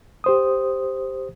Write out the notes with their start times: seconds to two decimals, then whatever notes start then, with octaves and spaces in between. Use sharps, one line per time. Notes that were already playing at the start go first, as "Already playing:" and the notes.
0.24 G4 C5 D#6